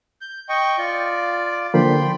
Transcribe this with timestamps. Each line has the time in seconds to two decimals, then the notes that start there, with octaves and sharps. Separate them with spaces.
0.21 G6
0.49 D#5 G5 C#6
0.78 F4 D5
1.74 D3 F3 A#3 G5 B5 C6